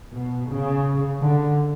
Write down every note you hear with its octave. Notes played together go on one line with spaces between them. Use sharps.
B2
C#3
D3